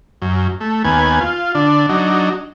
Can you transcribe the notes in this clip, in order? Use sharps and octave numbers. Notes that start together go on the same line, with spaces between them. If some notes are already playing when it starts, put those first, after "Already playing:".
F#2
A3
D#2 B3 G#5
F4
D3 D4
F#3 D4 D#4